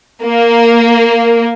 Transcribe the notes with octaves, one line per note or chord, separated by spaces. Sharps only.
A#3